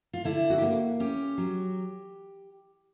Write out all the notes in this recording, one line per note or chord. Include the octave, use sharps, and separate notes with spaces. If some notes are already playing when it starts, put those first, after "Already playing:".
F4
D3 E4
F#4
G4
A#3 F#4
C#4 G4
F#3